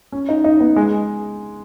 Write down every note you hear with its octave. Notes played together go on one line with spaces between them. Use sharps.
C#4
D#4
D#4
B3
G#3